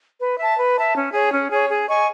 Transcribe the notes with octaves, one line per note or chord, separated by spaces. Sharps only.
B4
E5 A5
B4
E5 A5
C#4
G#4 C#5
C#4
G#4 C#5
G#4
D#5 G#5 C#6